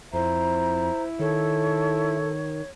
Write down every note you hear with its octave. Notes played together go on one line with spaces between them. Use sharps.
F2 E4 C5 A#5
D#3 A4 C#5